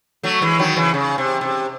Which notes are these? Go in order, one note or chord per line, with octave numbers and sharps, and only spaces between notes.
F#3 A3
E3 G#3
D#3 F#3
C#3 E3
C#3
C3
C3